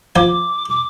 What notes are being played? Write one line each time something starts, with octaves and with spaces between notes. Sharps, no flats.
F3 G#5 D6
D6